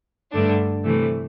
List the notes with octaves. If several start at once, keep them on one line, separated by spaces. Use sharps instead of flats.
G2 D3 A3 D4
C3 E3 A3